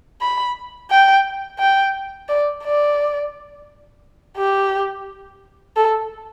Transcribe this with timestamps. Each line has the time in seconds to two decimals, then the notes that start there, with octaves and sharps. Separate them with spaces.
0.22 B5
0.91 G5
1.59 G5
2.29 D5
2.64 D5
4.37 G4
5.76 A4